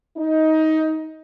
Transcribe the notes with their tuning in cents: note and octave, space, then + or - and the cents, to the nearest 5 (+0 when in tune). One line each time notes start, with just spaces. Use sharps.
D#4 +20